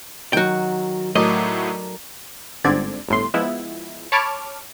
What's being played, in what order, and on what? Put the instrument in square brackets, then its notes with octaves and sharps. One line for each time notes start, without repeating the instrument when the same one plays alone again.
[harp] D#3 F#3 [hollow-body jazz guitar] F#4 G5
[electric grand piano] A2 F#3 A3 [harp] A4 A#4 D5 [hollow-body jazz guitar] D#5
[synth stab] G1 G#2 D3 C4 D5 G#6
G1 A2 C6
F3 G#3 B3 E4
C#5 A5 B5 D6 F6 G#6